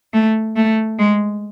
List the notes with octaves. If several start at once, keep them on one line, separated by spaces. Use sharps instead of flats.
A3
A3
G#3